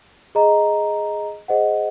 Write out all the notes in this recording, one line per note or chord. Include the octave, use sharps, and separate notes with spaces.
G#4 D#5 A#5
G#4 C5 D#5 F#5